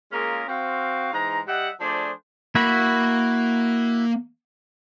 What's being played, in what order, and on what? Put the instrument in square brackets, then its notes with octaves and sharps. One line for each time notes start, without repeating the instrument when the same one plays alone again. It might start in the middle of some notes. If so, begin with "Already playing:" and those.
[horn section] G#3 A#3 C#4 F4 G#4 A#4
C4 F#4 F5
G#2 E3 G#3 A#5
G3 D#5 E5 F#5
F3 A3 D4 G#4 C5 D5
[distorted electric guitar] A#3 [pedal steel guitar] E4 F#4 B5